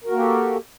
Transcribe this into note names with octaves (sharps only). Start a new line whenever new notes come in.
A#3 F#4 G4 A4 A#4